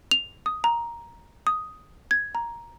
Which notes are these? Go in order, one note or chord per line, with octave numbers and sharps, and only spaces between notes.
F7
D#6
A#5
D#6
G#6
A#5